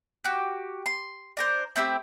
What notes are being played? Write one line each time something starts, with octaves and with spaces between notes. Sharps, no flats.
F#4 G4
C6
D4 A#4 C5
A3 C4 E4 G4